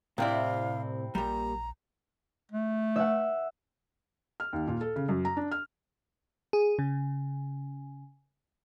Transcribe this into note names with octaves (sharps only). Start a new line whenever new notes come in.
C2 A2 C3 C4 E4 D5 F5
A#1 A#2 G3 A#5
A3
E5 F#5
F6
D#2
A#2
A4
C#3
F#2
A#5
D4
F6
G#4
C#3